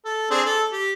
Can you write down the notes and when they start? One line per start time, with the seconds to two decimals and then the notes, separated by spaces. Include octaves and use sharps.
0.05 A4
0.30 C4 D4 G#4
0.46 A4
0.72 G4